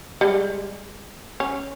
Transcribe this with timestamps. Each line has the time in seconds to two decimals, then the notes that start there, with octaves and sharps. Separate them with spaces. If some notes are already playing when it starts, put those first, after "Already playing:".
0.21 G3 G#3
1.40 C#4